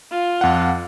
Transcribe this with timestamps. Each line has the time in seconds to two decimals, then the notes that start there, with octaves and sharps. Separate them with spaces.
0.11 F4
0.41 F2 F#5